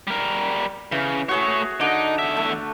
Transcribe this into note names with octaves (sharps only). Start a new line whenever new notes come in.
G3 A#4
C#3 E3
A3 F#4 G#4 C#5 E5
D3 D#4 D6
E2 E5
A3